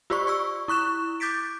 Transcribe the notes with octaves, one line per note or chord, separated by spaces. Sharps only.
F4 G4 C5 D5 C#6
D5 C#6 E6
E4 C#6 F#6 E7
D6 G6 A6 B6 D7